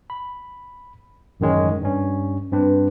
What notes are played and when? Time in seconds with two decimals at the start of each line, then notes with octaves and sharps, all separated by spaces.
0.10 B5
1.40 A1 F#2 D#3 G#3 C#4
1.82 G2 C#4
2.52 G2 C4 D4 B4